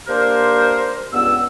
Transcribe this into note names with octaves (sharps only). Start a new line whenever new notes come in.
A#3 D4 G4 A#4 C5
C#2 G2 B3 E6